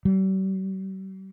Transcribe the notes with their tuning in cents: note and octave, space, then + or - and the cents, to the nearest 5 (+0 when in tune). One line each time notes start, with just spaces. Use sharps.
G3 -45